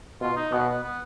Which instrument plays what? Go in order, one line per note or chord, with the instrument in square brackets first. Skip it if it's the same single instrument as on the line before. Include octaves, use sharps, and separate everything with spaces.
[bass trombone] B2 [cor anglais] F4
[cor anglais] D#4
[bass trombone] B2 [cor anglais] B3
[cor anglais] B3
B3